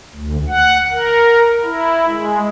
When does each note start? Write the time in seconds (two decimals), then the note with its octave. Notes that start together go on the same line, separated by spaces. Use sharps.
0.14 D2
0.48 F#5
0.92 A#4
1.63 E4
2.06 G#3